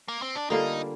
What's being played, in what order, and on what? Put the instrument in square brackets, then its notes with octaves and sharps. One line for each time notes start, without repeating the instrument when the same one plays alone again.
[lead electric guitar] A#3
C4
D4
[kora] D3 G3 A#3 F4 [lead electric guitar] D#4